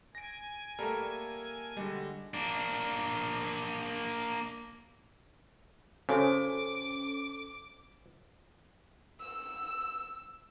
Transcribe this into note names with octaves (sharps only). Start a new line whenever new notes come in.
G#5 A#6 D7
G3 A3 A#3 A4 A#4
D3 G3 G#3 F#4
A#3 D4
C#3 C#4 F#4 A4 C5 D6
E6